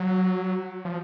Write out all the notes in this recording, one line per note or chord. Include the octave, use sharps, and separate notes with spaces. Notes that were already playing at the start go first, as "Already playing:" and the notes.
Already playing: F#3
F3